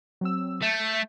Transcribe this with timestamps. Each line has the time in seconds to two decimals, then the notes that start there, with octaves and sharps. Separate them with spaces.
0.21 F#3 C4 E6
0.62 A3 E5 G6